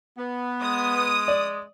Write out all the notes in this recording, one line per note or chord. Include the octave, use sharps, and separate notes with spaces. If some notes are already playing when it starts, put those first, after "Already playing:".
B3
G#3 D#6
D5